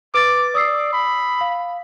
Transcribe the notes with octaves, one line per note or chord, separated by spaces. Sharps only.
B4 D6 A6
D5 D#6 E6 C7
B5
F5